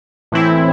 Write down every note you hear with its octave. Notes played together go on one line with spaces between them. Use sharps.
A2 E3 C4 E4